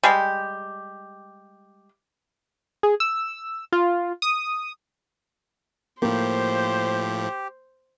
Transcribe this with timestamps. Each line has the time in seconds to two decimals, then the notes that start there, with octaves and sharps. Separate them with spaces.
0.03 G3 G#3 G4
2.83 G#4
3.00 E6
3.72 F4
4.22 D#6
6.02 A2 F3 A#3 G4 C5